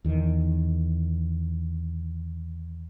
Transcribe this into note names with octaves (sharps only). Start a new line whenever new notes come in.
E2 D#3